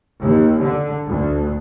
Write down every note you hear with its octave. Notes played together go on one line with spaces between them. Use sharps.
D#2
D3
D2